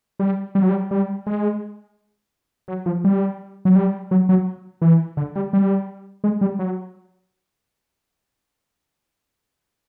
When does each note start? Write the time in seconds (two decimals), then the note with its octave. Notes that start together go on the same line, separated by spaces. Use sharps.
0.19 G3
0.55 G3
0.62 F#3
0.69 G3
0.91 G3
1.27 G#3
2.68 F#3
2.86 F3
3.04 G3
3.65 F#3
3.76 G3
4.11 F#3
4.29 F#3
4.82 E3
5.17 D3
5.36 G3
5.53 G3
6.24 G#3
6.41 G3
6.59 F#3